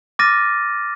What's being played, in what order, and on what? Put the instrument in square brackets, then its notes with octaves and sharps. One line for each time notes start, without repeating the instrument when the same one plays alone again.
[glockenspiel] D6 F6 A6 A#6 D#7